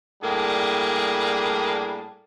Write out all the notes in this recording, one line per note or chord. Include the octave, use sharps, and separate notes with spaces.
A2 G3 A#3 D4 G#4